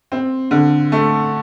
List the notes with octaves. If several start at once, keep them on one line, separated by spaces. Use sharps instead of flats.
C4
D3
A3